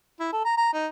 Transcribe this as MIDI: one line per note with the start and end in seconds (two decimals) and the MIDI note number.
0.20 0.28 64
0.33 0.41 69
0.45 0.56 82
0.58 0.73 82
0.73 0.87 63